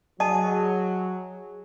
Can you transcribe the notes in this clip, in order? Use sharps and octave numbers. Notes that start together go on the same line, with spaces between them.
F#3 G#4 D#5 A5